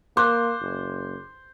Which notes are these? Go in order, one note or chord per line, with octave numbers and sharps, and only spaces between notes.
A#3 C5 D6 F#6
F#1